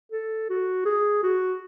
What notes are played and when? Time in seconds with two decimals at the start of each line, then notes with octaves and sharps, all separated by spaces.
0.12 A4
0.50 F#4
0.85 G#4
1.23 F#4